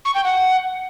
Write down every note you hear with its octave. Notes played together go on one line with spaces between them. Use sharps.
C#6
G5
F#5